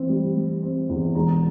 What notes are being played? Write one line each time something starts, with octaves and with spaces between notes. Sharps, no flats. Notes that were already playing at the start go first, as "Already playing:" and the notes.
Already playing: E3 C4
G3
G3
C4
E2
E1 A#5